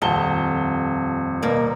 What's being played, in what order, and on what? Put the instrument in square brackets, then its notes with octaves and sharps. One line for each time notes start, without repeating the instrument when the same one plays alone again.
[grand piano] D#1 A5 G7 [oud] F2
[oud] B2 A#3 D5